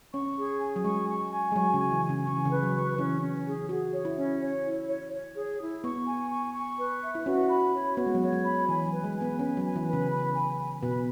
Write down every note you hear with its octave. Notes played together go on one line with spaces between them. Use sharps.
C#4 C#6
G#4
G#5
F#3
G#3 C#6
C#6
G#5
G#3
F#3 C#6
C#3
G#5
E3
G#5
C#3
C#3 C#6
E3
C#3
B4
F#3
C#6
E3 C#4
C#4
G#4
F#4 G#4
C#5
E4
C#4
C#5
E4
C#5
C#5
G#4
E4
B3 C#6
G#5
C#6
C#6
B4
E5
E4
C#4 F#4
B5
C#5
B3 F#4
G#3
F#3
G#3 C#5
F#3
B5
E3 G#5
F#3
B4
G#3
G#5
B3
C#4 B4
F#3
G#5
E3
B4
C#3
B5
G#5
B5
B2 B4